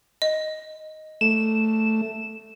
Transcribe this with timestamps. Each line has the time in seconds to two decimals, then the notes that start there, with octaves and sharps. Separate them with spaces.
0.22 D#5
1.21 A3 E7